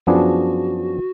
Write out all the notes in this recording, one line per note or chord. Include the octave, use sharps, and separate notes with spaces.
F#2 F3 B3 D4 F#4 G#4